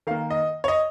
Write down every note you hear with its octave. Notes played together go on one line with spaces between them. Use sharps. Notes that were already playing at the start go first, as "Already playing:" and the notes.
D#3 A#3 F5
D#5
C#5
D#5